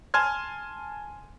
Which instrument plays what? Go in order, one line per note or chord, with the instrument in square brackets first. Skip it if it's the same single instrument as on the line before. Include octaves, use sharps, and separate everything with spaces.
[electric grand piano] G#5 A5 C6 F6 G#6